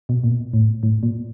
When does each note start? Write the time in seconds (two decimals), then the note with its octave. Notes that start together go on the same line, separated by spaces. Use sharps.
0.09 B2
0.24 A#2
0.53 A2
0.83 A2
1.03 A#2